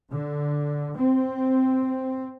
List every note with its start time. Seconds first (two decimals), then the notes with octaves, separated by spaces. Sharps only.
0.12 D3
0.95 C4